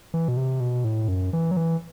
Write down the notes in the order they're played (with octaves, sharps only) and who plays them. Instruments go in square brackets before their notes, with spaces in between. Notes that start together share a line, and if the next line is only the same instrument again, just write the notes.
[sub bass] E3
B2
C3
B2
A2
F#2
E3
F#3
E3